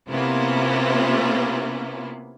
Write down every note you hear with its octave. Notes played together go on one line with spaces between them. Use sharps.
C3 A#3 B3 C#4 E4 F4